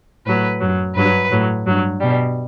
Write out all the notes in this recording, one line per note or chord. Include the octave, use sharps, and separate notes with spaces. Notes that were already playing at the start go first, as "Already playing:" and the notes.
A2 F#3 B4
F#2 F#3
G2 F#3 B4
A2 F#3
G2 F#3
B2 G3